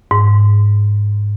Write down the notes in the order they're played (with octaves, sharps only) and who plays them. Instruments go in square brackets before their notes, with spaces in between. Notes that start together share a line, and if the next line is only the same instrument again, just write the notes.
[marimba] G#2